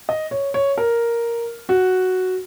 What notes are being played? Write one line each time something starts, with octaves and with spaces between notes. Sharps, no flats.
D#5
C#5
C#5
A#4
F#4